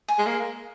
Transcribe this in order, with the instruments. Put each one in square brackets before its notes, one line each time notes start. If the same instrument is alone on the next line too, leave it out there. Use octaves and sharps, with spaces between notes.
[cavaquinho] G#5
[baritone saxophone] G#3
A#3